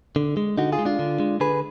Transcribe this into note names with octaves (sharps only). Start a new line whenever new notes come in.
D3
G#3
D3 D#4 F#4
F4 G#4
G#3
D4 F4
D3
G#3
D3 G#4 B4